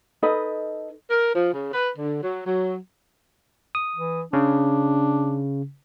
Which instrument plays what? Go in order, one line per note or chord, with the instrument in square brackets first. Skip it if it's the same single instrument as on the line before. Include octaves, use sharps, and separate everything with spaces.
[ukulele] D#4 A4 B4 D#5
[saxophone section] A#4
F3
C#3
B4
D3
F#3
F#3
[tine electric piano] D#6
[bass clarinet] E3
[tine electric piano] C#3 [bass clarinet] D4